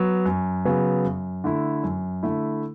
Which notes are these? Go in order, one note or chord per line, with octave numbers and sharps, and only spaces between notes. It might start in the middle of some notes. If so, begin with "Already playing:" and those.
Already playing: F#3 B3
F#2
C#3 F#3 B3
F#2
D3 A3 E4
F#2
D3 A3 E4